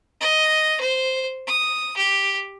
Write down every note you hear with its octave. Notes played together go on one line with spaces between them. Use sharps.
D#5
C5
D#6
G4